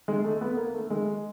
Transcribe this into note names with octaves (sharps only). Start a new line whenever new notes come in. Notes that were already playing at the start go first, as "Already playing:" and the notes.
G#3
A3
B3
A#3
A3
G#3